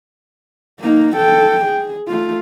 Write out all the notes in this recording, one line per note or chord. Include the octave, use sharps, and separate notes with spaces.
A#3 D#4
A4 G5
G#4
A3 F4